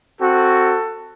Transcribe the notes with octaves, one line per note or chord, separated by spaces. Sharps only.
C4 F#4 A4